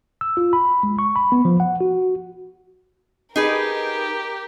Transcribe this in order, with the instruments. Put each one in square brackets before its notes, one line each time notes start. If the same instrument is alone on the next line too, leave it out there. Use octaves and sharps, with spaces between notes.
[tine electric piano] E6
F4
B5
G#3
C#6
B5
B3
F3
F#5
F#4
[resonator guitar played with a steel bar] D#4 G#4 B4 [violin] G4 A#4